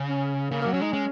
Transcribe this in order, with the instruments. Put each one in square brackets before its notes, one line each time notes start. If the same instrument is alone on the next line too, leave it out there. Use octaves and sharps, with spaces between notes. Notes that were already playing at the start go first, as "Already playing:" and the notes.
Already playing: [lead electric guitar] C#3
[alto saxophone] C#4
[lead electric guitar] C#3 [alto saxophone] A#3
[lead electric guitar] F#3 [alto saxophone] A#3
[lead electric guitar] F#3 [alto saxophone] C#4
[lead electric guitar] G#3 [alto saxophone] D#4
[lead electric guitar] G#3 [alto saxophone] C#4